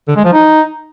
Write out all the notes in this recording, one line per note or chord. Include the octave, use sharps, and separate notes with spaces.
D3
G#3
F3
D#4